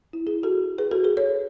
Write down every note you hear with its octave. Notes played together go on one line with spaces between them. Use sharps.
E4
E4 G#4
F#4 A4
G#4 B4
F#4 A4
G#4 B4
A4 C#5